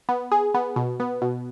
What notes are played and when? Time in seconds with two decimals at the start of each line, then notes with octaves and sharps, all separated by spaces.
0.09 B3
0.31 G#4
0.54 B3
0.76 B2
1.00 B3
1.22 B2